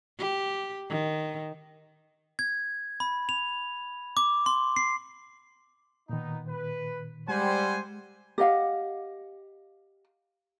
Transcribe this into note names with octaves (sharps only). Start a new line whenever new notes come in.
G4
D#3
G#6
B5
F7
D6
C6
C7
A#2 D#3 B3 D#4
B4
G3 G#3 C4 C5 F#5 G#5
G4 D#5 F5 F#5